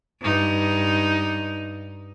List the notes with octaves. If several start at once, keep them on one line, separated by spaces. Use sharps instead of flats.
G2 D#4